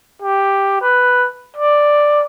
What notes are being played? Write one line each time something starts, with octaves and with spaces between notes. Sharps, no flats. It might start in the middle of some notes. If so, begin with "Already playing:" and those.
G4
B4
D5